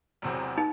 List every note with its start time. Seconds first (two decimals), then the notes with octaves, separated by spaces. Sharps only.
0.22 E1 E2 C3 F#3 C4
0.58 D#4